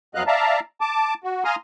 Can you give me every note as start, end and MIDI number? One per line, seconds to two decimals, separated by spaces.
0.15 0.23 41
0.15 0.23 54
0.15 0.23 59
0.15 0.23 75
0.15 0.23 77
0.15 0.23 90
0.27 0.60 74
0.27 0.60 76
0.27 0.60 77
0.27 0.60 81
0.27 0.60 82
0.81 1.14 81
0.81 1.14 86
1.24 1.44 66
1.45 1.56 77
1.45 1.56 80
1.45 1.56 82
1.45 1.56 84
1.45 1.56 87
1.45 1.56 89